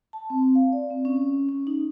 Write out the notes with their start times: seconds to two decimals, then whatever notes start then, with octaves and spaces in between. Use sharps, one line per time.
0.13 A5
0.30 C4
0.55 F5
0.72 D5
0.90 C4
1.05 C#4
1.49 C#4
1.67 D#4